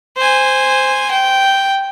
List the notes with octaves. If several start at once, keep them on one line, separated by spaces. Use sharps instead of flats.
C5 G#5
G5